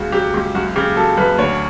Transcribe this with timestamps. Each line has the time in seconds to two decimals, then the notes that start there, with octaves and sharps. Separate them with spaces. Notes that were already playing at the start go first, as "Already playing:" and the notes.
Already playing: C#2 C#3 F#4
0.12 F#3 G4
0.34 C#2
0.55 F#2 F#4
0.76 C#3 G4
0.96 F#3 A4
1.17 F#2 B4
1.38 D2 C#5